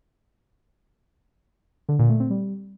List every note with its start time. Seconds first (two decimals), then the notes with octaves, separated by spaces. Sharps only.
1.89 D3
1.99 A#2
2.09 A3
2.20 C4
2.30 G3